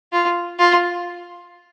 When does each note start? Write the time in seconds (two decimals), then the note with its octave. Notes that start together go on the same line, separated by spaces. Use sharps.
0.12 F4
0.59 F4